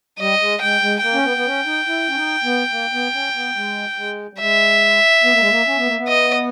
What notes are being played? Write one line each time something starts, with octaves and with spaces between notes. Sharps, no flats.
G3 D#5
G#3
G#3 G5
G#3
A#3 G5
C#4
B3
B3
C#4
D#4
E4
C#4
D#4
B3
A#3
B3
C#4
B3
G#3
G#3
G3
G#3 E5
B3
A#3
G#3
A#3
C#4
B3
A#3
B3
D#5